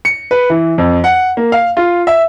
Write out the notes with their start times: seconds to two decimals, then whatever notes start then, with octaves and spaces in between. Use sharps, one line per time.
0.05 C#7
0.31 B4
0.50 E3
0.78 F2
1.04 F#5
1.37 A#3
1.52 F5
1.77 F4
2.07 E5